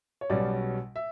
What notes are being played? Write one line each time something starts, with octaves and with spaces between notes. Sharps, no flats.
C#5
B1 B2 G3 C#4 D5
E5